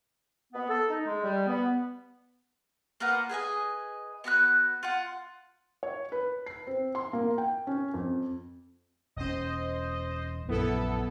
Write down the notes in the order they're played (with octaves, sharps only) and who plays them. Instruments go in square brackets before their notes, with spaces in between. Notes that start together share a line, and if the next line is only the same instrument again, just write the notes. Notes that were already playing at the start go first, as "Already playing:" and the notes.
[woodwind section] B3
A4
D#4
G#3
G3
B3
[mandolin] A#3 F4 B4 F#5
G#4 B4 D#5 G#5
B3 F#4 B5 F#6
F4 F#5
[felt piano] C#5
B4
C7
C4
C6
A#3
G5
C#4
F2
[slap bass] E1 C#4 [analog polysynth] C5 D#5
[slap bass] A#1 F#2 [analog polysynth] B3 E4 A4